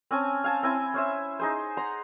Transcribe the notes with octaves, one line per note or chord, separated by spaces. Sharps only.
C4 C#4 G#5 A5
F5 G#5 A5
C4 E4 G#5
C#4 C5 E5
D#4 G#4 C5
F#5 A#5 C6